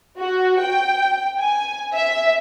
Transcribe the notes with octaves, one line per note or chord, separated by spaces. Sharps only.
F#4
G5
G#5
E5